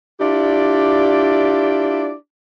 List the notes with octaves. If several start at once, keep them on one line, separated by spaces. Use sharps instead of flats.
D4 E4 F4 G4 D5